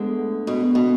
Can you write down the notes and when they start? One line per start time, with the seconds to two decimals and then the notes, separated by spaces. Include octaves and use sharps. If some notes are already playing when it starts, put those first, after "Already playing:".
Already playing: D2 D3 G#3 B3
0.47 B2
0.75 B2